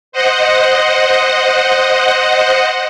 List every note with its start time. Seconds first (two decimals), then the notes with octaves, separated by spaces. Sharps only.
0.12 C5 D#5 F#5